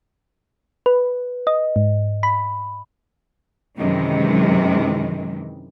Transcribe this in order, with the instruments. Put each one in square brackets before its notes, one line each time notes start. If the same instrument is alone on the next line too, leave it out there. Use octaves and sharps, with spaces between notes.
[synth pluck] B4
D#5
G#2
B5
[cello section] F#2 C3 D#3 E3 G#3